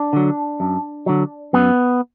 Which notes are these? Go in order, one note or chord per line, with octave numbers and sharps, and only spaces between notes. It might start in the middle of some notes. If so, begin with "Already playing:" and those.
Already playing: D4
D3 F#3
F#2
D3 F#3
F#2 B3